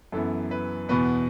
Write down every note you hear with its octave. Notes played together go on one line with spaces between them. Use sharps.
F#2 E3 B3 A4
B4
E2 B2 B3 B4